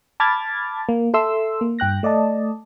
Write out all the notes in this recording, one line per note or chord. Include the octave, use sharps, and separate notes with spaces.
A5 B5 D6 F6 G#6 A6
A#3
A4 E5 C6 E6
A#3
G2 G5 F#6 A#6
A3 D5 D#5 A5